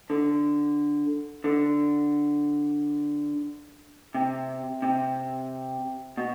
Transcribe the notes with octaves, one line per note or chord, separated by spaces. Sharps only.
D3
D3
C3
C3
B2